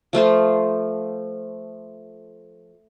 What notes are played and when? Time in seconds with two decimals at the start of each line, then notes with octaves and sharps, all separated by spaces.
0.13 F3 A3 F4 C5